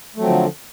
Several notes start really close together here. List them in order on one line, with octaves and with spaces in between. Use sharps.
A3 F#3 C4 F3 D3